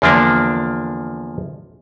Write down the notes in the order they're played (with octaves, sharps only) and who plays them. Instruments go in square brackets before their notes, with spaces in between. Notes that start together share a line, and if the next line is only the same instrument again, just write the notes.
[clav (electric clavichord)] E2 D3 F3 A#3 D4